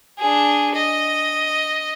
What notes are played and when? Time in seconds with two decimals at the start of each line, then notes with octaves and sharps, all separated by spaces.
0.19 D4 G#4
0.75 D#5